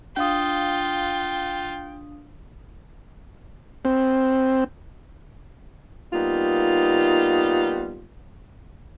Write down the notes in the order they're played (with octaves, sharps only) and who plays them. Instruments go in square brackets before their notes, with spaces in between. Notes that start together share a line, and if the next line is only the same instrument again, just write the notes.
[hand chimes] D4 F5 D#6 [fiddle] F4 [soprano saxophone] G5
[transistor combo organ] C4
[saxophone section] G3 A#3 B3 D#4 F4